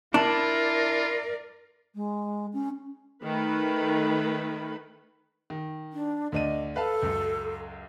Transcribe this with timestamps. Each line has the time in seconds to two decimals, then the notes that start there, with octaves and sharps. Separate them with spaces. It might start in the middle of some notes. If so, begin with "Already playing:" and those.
0.14 D4 E4 F4 A#4 D5
1.95 G#3
2.53 C#4
3.24 D#3 A3 B4
5.50 D#3
5.93 D4
6.32 D2 D4 D#5 D#7
6.76 A4 B4 F5 A5
7.02 C#2 F#2